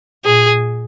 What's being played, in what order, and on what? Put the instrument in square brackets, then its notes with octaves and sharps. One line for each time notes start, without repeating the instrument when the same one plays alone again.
[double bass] A#2 [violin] G#4